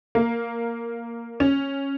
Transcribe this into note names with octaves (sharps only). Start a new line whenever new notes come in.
A#3
C#4